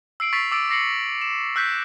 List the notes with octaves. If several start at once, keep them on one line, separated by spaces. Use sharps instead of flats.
E6 C7 D7 F#7
C#6 A6 B6 C7 F7
D6 E6 A6 D7
D6 A#6 C7 C#7 F#7
E7
E6 F#6 G6 B6